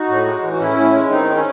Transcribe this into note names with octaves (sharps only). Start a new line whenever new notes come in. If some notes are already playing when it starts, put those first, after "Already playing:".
Already playing: D#4 F#4
A2
G#3
E3
F#4
A2 C#4 E4
A2
G#3
D#3 C4 D#4
C#4